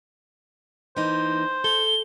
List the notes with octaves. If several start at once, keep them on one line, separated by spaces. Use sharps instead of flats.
E3 A#3 D#4 C5
A4 G7